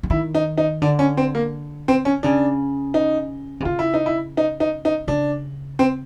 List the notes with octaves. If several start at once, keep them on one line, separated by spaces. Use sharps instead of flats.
E3
D#3 E4
D#4
D#4
D3 D4
C#4
C4
A#3
C4
C#4
C#3 D4
D#4
C3
C#3 F4
E4
D#4
E4
D#4
D#4
D#4
C#3 D4
C4